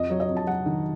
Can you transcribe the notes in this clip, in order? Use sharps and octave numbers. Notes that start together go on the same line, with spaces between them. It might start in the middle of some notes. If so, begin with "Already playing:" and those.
Already playing: F2 D#5
F#3 C#5
D#5
F2
A5
F#3 F#5
D#3